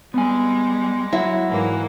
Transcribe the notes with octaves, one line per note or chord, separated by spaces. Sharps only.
G3 G#3 B3 G#5
F#3 E4
G#2 E3 A#3